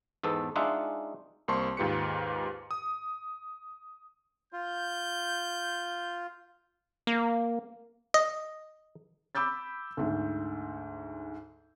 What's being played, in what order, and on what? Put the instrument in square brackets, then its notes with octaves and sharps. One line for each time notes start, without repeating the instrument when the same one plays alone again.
[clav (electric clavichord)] E2 G#2 B3 A4
G#3 D4 D#4 F4 E5 F#5
[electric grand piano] C2 A#3 C5 A5 C6 C#6
D#2 G#2 F4 G4 B4 C#7
D#6
[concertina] F4 [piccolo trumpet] G6
[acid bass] A#3
[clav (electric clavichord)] D#5
[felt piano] B5 D6 E6 G6 A6
D2 G#2